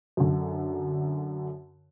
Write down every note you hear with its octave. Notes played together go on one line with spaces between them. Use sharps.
F#2 D3